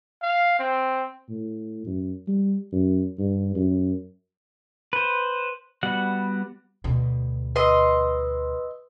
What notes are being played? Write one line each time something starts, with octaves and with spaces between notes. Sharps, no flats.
F5
C4
A2
F#2
G3
F#2
G2
F#2
B4 C5
G3 B3 F#4 F#5
D2 B2
B4 D#5 C6 E6